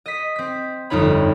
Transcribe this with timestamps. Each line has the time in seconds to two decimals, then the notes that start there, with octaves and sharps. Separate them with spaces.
0.06 D#5 B6
0.36 C4 B6
0.90 G1 F2 G3 D#4 C#5 B5